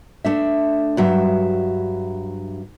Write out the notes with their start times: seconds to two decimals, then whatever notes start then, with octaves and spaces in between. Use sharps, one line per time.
0.25 A3 D4 E5
0.97 G2 F#3 E5